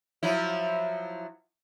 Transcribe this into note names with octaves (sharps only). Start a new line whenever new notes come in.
F3 F#3 E4